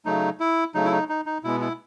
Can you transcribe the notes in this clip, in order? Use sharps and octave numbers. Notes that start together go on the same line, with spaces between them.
C#3 F#3 A3 D#4
E4
C#3 F#3 A3 D#4
E4
D#4
D#4
D#4
B2 G#3 B3 E4
E4